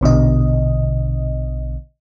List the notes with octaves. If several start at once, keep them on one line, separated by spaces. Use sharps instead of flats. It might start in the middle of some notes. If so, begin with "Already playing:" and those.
A#1 B2 D3 D#5